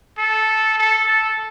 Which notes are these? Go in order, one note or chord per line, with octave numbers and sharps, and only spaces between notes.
A4
A4
A4